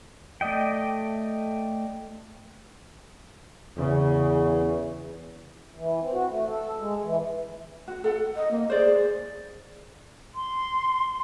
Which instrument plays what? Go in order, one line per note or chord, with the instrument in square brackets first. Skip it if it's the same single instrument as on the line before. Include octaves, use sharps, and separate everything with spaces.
[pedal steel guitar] A3 D5 D#5 G5
[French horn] E2 [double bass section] C#3
[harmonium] E3
C4
F#4
A3
A4
G#3
E3
[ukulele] F#4
A4 F#5
[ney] D#5
A#3
[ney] G#4 [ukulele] C5 D5
[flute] C6